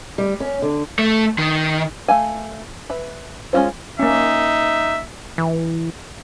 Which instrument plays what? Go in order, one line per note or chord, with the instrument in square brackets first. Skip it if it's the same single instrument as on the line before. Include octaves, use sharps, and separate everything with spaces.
[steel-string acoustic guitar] G3
C#4
D3
[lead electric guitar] A3
D#3
[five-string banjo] A3 F5 G#5
B4 E5
G#3 C#4 E4 F4 C5
[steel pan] A#3 C#4 [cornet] D#4 [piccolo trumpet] E5
[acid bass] E3